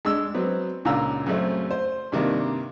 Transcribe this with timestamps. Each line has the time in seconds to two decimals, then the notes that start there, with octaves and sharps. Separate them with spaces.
0.05 G#3 D4 E6
0.34 F#3 B3 C4
0.85 C#2 A#2 D4 F5 A#5 E6
1.26 F#2 C#3 A3 C4
1.71 C5
2.12 G2 C3 D#3 A#3 D4